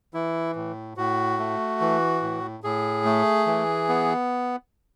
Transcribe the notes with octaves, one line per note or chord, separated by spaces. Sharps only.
E3 E4
A2
A2 F#4
A3
E3
A2
A2 G#4
A3
E3
B3